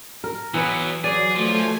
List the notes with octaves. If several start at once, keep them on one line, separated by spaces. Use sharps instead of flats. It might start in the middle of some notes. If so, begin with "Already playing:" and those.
A#4
E3 F#3 B3 B4
F#3 G#4 D5
F3 A3 G#5